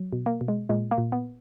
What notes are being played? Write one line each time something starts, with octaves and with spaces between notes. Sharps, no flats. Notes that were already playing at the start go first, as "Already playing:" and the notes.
Already playing: F#3
B2
A#3
B2
G#3
A#2 G#3
A#3
A#2
B3